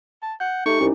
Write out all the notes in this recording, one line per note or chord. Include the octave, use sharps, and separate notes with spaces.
A5
F#5 G6
A3 D#4 G4 C#6
C2 C#4 E4